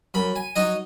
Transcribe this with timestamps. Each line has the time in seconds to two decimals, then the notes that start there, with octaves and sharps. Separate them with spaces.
0.14 F#2 B5
0.36 G#5
0.56 F#3 D#4 D#5